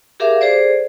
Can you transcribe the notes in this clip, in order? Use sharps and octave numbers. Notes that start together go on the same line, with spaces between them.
G4 G#4 A#4 E5 F5 D6
G#4 A4 C5 D5